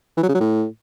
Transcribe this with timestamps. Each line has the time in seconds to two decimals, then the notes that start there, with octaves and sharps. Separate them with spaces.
0.17 E3
0.23 F#3
0.29 C#3
0.35 F#3
0.40 A2